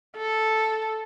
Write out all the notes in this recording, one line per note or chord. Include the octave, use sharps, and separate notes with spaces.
A4